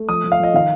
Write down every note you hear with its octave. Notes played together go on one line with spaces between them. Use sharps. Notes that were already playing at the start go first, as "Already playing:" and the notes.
Already playing: A3
F3 D#6
F3
F5
F3 D#5
D#3 F5